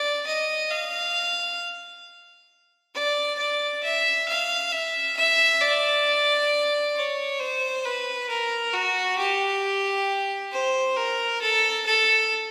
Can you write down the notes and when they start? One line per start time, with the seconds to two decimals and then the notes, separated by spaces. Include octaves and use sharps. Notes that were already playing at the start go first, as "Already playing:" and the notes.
Already playing: D5
0.26 D#5
0.71 F5
2.94 D5
3.38 D5
3.83 E5
4.28 F5
4.73 E5
5.17 E5
5.61 D5
6.96 C#5
7.40 C5
7.85 B4
8.29 A#4
8.74 F#4
9.18 G4
10.52 C5
10.97 A#4
11.42 A4
11.86 A4